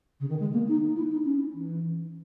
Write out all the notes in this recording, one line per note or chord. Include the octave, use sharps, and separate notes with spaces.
C#3
D#3
G#3
A#3
D#4
E4
D#4
C#4
E3